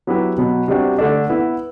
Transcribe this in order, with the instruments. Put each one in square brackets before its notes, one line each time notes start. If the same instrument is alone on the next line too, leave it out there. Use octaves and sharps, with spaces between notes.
[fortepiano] F#3 B3 E4 G4 B4
B2 F#3 B3
C3 G3 D4 F#4 C5
D3 A3 D4
B3 E4 B4